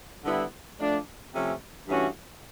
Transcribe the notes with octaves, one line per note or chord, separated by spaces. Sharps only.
D3 G3 B3 E4
F3 A3 D4
C3 F3 A3 C#4
G2 E3 A3 C#4 F#4